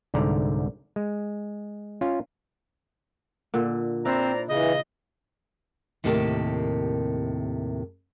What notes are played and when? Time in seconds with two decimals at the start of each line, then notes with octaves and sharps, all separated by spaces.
0.14 C2 G#2 D3 D5 A#5
0.96 G#3
2.01 C#4 F4
3.54 A#2 D3
4.05 C4 D4 E4 C5 D5 A#5
4.48 C#3 E3 D#5
6.04 D#2 A2 C3 G4 A#4 A5